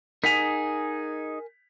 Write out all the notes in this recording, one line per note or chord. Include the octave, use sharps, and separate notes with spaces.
D#4 G#4 A#4 F#5 G#5 B6 F7